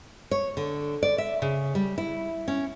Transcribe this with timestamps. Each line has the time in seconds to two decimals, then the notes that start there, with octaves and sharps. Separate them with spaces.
0.31 C#5
0.57 D3
1.03 D5
1.18 E5
1.42 C#3
1.75 G3
1.98 E4
2.48 C#4